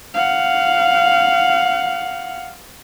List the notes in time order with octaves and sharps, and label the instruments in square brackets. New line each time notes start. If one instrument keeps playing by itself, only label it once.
[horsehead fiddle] F5 F#5